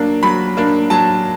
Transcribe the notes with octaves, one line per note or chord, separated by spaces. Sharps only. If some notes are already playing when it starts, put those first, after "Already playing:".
Already playing: F#3 A#3 D4
F#3 B5
A#3 D4
F#3 A5